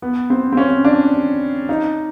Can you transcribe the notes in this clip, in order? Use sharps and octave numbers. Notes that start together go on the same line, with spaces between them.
B3
C4
C4
C#4
D4
D#4